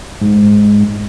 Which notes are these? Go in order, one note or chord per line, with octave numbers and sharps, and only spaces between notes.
G#2